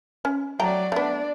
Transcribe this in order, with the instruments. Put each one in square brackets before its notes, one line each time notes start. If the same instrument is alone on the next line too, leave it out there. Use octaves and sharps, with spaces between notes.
[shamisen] C#4
[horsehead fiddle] F#3 D5 [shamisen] A3 G5 A#5
[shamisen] A3 B3 [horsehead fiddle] D4 D5